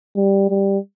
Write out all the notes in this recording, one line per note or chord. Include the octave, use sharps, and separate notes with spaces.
G3
G3